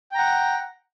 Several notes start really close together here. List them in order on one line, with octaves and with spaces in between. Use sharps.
G5 A#5 F#5